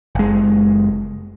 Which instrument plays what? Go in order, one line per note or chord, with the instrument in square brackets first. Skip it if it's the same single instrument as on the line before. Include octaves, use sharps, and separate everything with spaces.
[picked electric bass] F#1 G#3